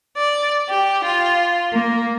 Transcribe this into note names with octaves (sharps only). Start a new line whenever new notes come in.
D5
G4
F4
A#3